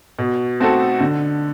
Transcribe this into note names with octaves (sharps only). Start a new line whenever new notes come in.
B2
A3 C4 F#4 A4
D3